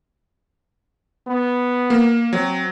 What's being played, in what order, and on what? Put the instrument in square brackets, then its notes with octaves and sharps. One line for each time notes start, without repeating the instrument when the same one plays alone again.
[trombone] B3
[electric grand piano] A#3
[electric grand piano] F#3 [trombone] C4